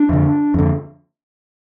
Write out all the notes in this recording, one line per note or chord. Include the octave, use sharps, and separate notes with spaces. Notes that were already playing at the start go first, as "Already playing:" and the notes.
Already playing: D4
F2 D3
F2 D3